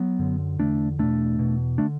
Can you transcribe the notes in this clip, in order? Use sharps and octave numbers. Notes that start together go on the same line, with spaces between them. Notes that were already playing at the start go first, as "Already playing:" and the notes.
Already playing: F#3 B3
F#2 D3
E2 D3 A3 D4
E2 B2 A3 D4
E2 B2
D3 A3 D4